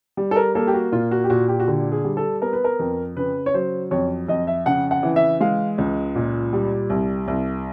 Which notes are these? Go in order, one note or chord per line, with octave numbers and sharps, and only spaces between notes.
G3
A4
A#4
A#3 A4
G4
F#4
A#2 F4
F#4
G4
A#2 F#4
G4
F#4
D3 G4
G#4
G3
A4
B3 A#4
B4
A#4
F2
C#3 B4
C#5
F#3 C5
F2 C#5
F2 D#5
E5
C#3 F#5
F#5
E3
E5
G#3 F5
C#2
A#2
G3
C2
C2